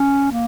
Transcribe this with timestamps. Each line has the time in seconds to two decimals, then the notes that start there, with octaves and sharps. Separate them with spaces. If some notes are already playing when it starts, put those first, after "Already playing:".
Already playing: C#4
0.32 A#3